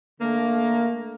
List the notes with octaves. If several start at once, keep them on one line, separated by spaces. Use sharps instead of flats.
D3 A3 A#3